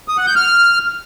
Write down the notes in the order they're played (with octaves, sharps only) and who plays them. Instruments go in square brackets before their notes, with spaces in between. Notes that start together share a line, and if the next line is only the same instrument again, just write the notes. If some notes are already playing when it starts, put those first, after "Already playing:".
[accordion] D#6
F#5
G6
F6